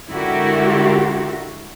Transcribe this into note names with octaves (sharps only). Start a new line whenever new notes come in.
D3 G#3 E4 F#4 G4 A#4